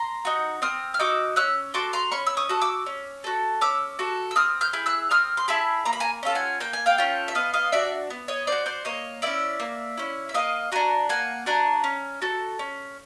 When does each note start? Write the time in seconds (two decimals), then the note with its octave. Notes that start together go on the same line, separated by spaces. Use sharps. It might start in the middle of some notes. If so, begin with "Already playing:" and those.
Already playing: A#5 C6
0.25 D#4 F#4
0.62 C4 D#6 F6
0.94 F6
0.99 D#4 F#4 D6 E6
1.36 C#4 E6 F#6
1.74 F#4 A4 C6 D6
1.93 A#5 C6
2.12 C#4 B5 C#6
2.27 E6
2.37 C#6 D#6
2.49 F#4 A4
2.61 D6 E6
2.86 C#4
3.24 F#4 A4
3.61 C#4 D6 E6
3.99 F#4 A4
4.31 E6
4.36 C4 D#6 F6
4.61 F6 G6
4.73 E4 G#4
4.86 E6 F#6
5.11 C4 D#6 F6
5.37 C6
5.48 E4 G#4 A5 B5
5.85 A#3 A#5
5.93 B5
6.00 G#5 A#5
6.23 C#4 F4 A4
6.35 F#5 G#5
6.60 A#3 G5
6.73 G#5
6.86 F5 G5
6.98 C#4 F4 A4
7.28 E5
7.35 B3 D#5 F5
7.54 D#5 F5
7.72 D4 F#4 D5 E5
8.10 B3
8.28 C#5 D#5
8.47 D4 C5 D5
8.52 F#4
8.66 C5 D5
8.85 A#3 C#5 D#5
9.22 C#4 E4 D5 E5
9.60 A#3
9.98 C#4 E4
10.29 E5
10.34 A#3 D#5 F5
10.72 D4 F#4 G#5 A#5
11.09 A#3 F#5 G#5
11.46 D4 F#4 G#5 A#5
11.84 C#4
12.22 F#4 A4
12.59 C#4